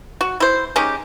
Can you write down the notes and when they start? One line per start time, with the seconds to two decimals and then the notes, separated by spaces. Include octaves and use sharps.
0.21 F#4
0.40 E4 C5
0.76 G#3 C#4 D#4 G4